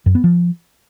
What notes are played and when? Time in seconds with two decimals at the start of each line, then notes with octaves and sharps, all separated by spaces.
0.06 F#2
0.15 B3
0.24 F3